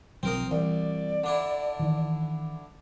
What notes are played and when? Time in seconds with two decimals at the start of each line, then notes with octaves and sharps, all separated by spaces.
0.23 B1 F3 F#3 C4 A#4 D#5
0.51 C2 E3 D5
1.24 D3 D4 E4
1.79 D#3 E3